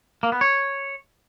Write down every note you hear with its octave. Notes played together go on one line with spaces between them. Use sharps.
A#3
B3
C#5